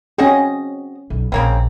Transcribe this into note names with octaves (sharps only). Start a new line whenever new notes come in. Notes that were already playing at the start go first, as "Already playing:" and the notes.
C4 C#4 F#4 G#4 D#5
B1
A#1 C#3 A#3 C4